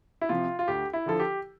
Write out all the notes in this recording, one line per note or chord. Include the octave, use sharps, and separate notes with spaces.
E4
C3 F3 F4
F4
D2 G4
E4
D3 F3 A4
G4